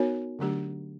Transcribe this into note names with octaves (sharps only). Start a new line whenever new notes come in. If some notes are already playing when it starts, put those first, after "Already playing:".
Already playing: B3 D#4 F#4 A#4 C#5
D3 F#3 A3 D4 G4